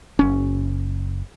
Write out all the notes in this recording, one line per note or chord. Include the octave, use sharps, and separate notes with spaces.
F#1 C#4